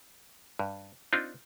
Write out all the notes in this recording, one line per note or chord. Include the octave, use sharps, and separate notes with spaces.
G2
C4 D4 D#4 F4